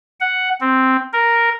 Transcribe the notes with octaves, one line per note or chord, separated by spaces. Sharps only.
F#5
C4
A#4